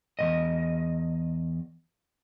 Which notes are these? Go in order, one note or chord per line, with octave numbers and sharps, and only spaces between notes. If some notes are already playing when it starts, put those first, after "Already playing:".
E2 G#2 D#5